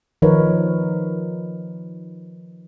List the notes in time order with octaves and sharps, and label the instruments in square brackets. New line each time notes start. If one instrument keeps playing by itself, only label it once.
[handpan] D#3 F3 D#4 A#4 B4 C#5